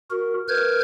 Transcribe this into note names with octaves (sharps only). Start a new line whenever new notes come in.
F#4 A#4
A#4 B4 F6 G6 G#6